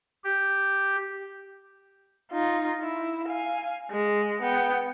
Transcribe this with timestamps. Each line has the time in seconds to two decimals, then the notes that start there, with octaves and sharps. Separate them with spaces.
0.24 G4
2.32 D#4 F4
2.82 E4
3.28 F5 G#5
3.91 G#3
4.41 B3 G5